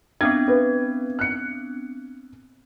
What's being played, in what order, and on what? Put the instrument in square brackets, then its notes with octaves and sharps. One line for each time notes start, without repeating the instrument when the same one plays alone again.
[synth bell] B3 C4 D4 [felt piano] G#6
[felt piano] B4
F#6 C#7